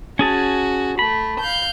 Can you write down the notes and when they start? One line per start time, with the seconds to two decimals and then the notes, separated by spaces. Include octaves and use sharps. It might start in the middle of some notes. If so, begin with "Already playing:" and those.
0.19 C#4 F#4 G#4 A5
0.99 A3 B5
1.40 F5 G6